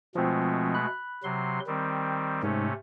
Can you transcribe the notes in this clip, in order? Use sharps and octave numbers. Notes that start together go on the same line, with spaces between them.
B2 F3 G#3 A3 C4
B5 F#6
C3 F#3 C6
D#3 G3 C4
G#2 C3 A3 C#4